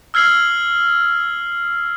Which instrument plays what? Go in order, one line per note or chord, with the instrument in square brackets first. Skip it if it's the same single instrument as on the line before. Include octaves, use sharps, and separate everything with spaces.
[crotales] E6 F6 G#6 C7 F#7